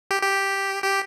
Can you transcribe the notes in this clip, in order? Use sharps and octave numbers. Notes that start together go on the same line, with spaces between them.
G4
G4
G4